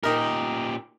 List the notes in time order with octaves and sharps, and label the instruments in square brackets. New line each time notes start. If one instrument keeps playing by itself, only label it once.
[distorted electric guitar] A#2 G4 [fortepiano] D#4 A#4